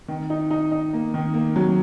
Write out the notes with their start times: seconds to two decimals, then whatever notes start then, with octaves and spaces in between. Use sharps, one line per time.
0.08 D#3
0.30 D#4
0.50 D#4
0.72 D#4
0.93 A#3
1.14 D#3
1.34 A#3
1.56 F#3